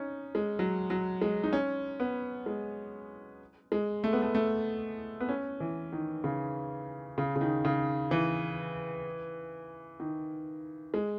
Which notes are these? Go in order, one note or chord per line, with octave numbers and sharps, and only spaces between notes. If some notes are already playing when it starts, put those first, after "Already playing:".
Already playing: C#4 D#4
G#3
F#3
F#3
G#3
D#4
C#4
B3
G#3
G#3
A3
B3
A3
A3
B3
C#4
E3
D#3
C#3
C#3
C#3
D#3
C#3
E3
D#3
G#3